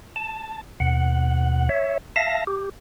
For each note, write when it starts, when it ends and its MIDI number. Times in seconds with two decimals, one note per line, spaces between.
0.16 0.61 81
0.80 1.69 39
0.80 1.69 47
0.80 1.69 78
1.69 1.98 73
1.69 1.98 76
2.16 2.44 76
2.16 2.44 77
2.16 2.44 81
2.16 2.44 94
2.47 2.69 67